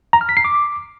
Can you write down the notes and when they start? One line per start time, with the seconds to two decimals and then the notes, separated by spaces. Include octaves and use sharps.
0.13 A#5
0.21 F6
0.29 B6
0.37 C7
0.45 D6